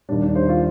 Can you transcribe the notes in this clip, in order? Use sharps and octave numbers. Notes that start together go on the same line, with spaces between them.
D#2 D#3 G3 D4
D4
C5
F4